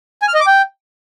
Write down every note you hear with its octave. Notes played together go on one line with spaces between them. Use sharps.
G#5
F6
D#5
D6
G5